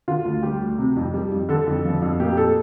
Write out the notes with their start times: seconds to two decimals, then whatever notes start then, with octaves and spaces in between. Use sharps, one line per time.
0.08 D3 F4
0.25 D2
0.43 G3 G4
0.61 D2
0.78 C3
0.97 F2
1.14 G3
1.32 F2
1.49 D3 A4
1.67 F2
1.85 F3
2.02 F2
2.20 A#2 G4
2.37 A4